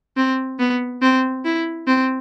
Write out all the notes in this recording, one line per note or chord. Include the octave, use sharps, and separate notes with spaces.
C4
B3
C4
E4
C4